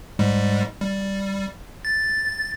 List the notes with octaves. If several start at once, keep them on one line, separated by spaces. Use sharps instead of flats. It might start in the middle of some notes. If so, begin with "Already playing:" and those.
G#2 G3 G#3
G3
A6